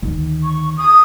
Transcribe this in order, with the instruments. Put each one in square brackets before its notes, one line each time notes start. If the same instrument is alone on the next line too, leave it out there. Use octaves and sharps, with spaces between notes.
[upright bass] D2 D#3
[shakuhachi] C#6
D#6